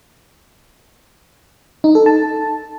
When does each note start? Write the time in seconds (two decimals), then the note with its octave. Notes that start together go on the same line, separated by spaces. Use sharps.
1.84 D#4
1.95 A4
2.06 A5